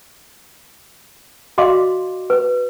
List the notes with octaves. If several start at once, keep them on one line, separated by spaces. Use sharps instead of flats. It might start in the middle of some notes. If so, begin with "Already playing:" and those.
F#4 D5 D#5 F5 C6 D6
B4